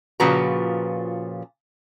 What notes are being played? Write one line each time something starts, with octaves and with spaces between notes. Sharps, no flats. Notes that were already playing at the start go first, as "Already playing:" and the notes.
A#2 C#3 F3 F#4 B4 A#5